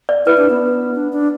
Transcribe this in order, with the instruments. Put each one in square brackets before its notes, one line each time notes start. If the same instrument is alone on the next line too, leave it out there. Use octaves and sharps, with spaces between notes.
[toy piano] D5
[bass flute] E4 [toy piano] B4
[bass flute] D4
B3
D4
D4